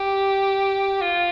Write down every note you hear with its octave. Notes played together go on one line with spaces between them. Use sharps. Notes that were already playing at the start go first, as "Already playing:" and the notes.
Already playing: G4
F4